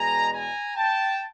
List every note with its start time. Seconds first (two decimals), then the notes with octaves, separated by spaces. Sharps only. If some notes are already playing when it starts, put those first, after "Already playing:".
Already playing: E2 B2 G#3 G#5 A#5
0.32 G#5 A#5
0.76 G5 A5